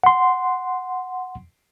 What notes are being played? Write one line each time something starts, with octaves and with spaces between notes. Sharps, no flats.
F#5 C6